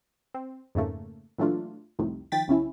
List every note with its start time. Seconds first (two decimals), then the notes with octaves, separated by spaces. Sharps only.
0.34 C4
0.75 F2 G#2 C#3 A3 A#3
1.38 A#2 E3 F#3 A3 D4 F4
1.99 C2 F2 A2 C3 D#3
2.32 D#3 F3 G5 A6 B6
2.48 B1 C#3 C#4 E4